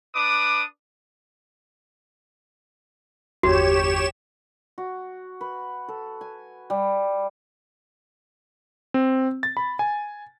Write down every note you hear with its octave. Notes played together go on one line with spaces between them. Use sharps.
D4 B4 D6 D#6
G1 E2 F#4 G4 C#5 E7
F#4
B4
A4
G#5
G3
C4
A6
B5
G#5